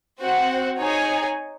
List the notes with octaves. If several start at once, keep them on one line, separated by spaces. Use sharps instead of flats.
C4 F#4 C5 F#5
D#4 G#4 C#5 G#5